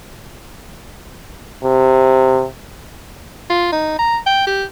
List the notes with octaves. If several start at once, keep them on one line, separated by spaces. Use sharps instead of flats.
C3
F4
D#4
A#5
G5
G4